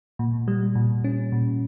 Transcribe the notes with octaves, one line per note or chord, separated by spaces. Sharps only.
A#2
G3
A#2
C#4
A#2